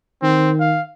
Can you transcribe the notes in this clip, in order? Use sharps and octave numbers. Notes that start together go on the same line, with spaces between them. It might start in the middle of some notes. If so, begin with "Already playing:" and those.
D#3 C4
F5